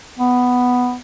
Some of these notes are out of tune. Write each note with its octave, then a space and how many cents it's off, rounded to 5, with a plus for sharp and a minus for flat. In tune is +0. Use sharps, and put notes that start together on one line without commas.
B3 +5